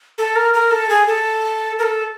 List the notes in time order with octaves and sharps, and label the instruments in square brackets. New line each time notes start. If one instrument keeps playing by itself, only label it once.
[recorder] A4
A#4
A#4
A4
G#4
A4
A#4
A4